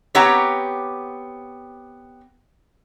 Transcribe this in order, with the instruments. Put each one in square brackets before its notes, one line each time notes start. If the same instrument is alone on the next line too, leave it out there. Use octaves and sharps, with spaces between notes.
[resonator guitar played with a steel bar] B3 C4 G4 C#5 F#5 A#5